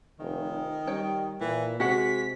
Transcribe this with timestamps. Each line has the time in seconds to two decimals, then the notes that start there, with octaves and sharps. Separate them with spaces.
0.19 F1 D#3
0.87 G3 C#5 G5
1.41 A#2 E3
1.80 C3 G#3 F#4 F#5 B6